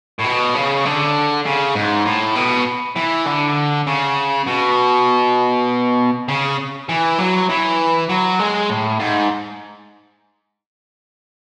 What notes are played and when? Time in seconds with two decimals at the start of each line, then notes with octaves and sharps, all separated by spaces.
0.20 A2
0.25 B2
0.55 C#3
0.85 D3
1.46 C#3
1.75 G#2
2.06 A2
2.36 B2
2.97 E3
3.27 D3
3.87 C#3
4.47 B2
6.28 C#3
6.89 E3
7.19 F#3
7.49 E3
8.09 F#3
8.39 G#3
8.70 A2
9.00 G#2